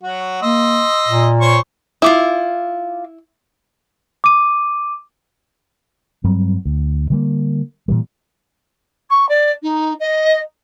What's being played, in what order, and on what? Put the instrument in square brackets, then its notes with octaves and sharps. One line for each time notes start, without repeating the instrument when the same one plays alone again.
[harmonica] F#3 F#4
[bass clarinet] A#3 [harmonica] D#5 C6 E6
[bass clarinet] A#2
[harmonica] C5 C#5 C#6
[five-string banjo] E4 [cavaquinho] F4 D6 D#6
[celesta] D6 D#7
[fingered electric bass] G2 F#3 G3 C4
D2
D3 G3 A#3
A#2 E3 G3
[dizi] C#6
D5
D#4
D#5